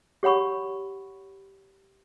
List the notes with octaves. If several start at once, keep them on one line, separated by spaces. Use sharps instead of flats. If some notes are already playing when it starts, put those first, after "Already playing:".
G4 C#5 F#5 B5 C#6